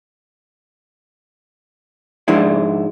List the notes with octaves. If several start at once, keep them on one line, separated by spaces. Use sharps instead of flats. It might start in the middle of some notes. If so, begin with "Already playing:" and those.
G#2 F3 G#3 D4 E4